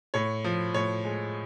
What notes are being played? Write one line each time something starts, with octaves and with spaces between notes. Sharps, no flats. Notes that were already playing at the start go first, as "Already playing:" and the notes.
A2 C#5
F3
A2 C#5
G#3